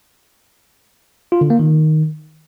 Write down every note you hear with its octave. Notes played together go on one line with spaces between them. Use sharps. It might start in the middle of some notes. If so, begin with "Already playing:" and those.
F4
D3
A#3
D#3